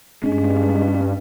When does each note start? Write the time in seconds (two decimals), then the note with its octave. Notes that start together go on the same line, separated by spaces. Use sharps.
0.24 G2 G#3 C#4 D4